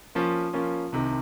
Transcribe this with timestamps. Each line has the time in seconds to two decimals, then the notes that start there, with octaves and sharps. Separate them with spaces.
0.15 F3 A#3 C#4 F4
0.53 F3 A#3 C#4 F4
0.92 C2 C3 D#3